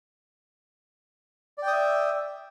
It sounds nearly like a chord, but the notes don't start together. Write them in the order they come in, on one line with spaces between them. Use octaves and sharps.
D5 G5 D#6 E5